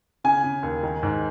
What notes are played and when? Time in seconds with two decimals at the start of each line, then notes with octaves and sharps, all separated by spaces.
0.24 C#3 G#5
0.44 C#3
0.63 D#2
0.83 D#3
1.03 G#2